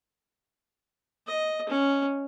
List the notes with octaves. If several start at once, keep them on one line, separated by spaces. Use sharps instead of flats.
D#5
C#4